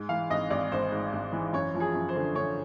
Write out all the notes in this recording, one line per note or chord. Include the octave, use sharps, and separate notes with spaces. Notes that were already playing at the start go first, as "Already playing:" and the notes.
Already playing: G#2
E3 F5
G#1 D#5
G#1 D5
G#1 C5
G#2
G#1
E3
F#2 C#5
F3
G#4
F#2
C5
D3
D3 C#5